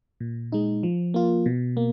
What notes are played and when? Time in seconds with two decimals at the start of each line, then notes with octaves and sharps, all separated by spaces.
0.20 A#2
0.52 G#3 D#4
0.83 F3
1.14 A#3 F4
1.46 B2
1.77 A#3